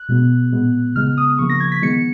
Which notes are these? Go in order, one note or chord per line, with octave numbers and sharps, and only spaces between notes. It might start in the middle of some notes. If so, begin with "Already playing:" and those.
Already playing: F#6
B2 G#3 B3
A#2 G#3 B3
C#3 G#3 B3 F6
D#6
C#3 F3 A#3 C#6
A#6
G#6
B6
D#3 G#3 B3 C#7